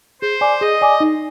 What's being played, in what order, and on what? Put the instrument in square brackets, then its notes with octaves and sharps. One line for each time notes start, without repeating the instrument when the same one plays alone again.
[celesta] G#4 [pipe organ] C5
[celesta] D5 G#5 D6
[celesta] G#4 [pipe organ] D#5
[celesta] D5 G#5 D6
D#4